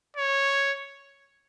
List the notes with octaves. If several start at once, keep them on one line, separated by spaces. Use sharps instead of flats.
C#5